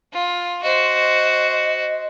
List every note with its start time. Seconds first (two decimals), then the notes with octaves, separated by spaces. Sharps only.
0.13 F4
0.63 F#4 C5 D#5